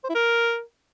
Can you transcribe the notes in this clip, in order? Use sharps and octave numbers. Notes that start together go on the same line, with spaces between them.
C5
E4
A#4